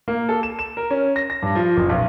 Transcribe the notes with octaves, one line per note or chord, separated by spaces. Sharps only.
A#3
A4
E7
E7
A#4
C#4
A#6
A#6
G2
F3
F#1
B1